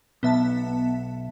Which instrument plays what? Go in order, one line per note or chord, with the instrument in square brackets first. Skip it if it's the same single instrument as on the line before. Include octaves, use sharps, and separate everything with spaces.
[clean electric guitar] B1 [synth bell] B3 E5 A5